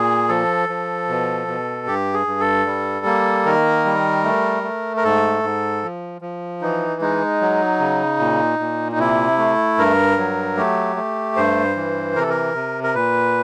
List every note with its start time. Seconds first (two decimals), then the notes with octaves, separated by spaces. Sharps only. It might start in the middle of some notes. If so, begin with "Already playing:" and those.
Already playing: A#2 G#4
0.28 F3 A4
0.69 F3
1.09 B2
1.47 B2
1.86 G2 G4
2.14 G#4
2.27 G2
2.40 A4
2.66 G3
3.06 A#3
3.46 D#3 A#4
3.85 G3
4.24 A3
4.63 A3
4.97 A#4
5.04 G#2 A4
5.43 G#2
5.83 F3
6.22 F3
6.61 E3 D#4
7.01 G#3 D#4
7.41 F#3
7.80 C#3
8.19 A#2
8.59 A#2
8.92 D#4
8.99 C3 E4
9.38 A3
9.78 G2 A#4
10.17 F#3
10.57 A3 G4
10.96 A3
11.36 G2 C5
11.76 E3
12.16 C3 A#4
12.22 A4
12.30 A#4
12.54 C3
12.84 A#4
12.95 A#2 B4